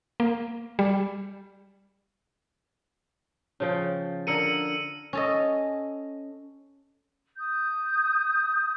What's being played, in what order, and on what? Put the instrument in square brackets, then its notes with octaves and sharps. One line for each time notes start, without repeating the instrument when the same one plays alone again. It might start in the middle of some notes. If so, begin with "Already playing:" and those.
[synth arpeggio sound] A#3
G3
[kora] C#3 F3 G5
[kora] D3 A#4 [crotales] E6 C#7 D#7
[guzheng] C#4 A4 D#5
[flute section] D#6 G6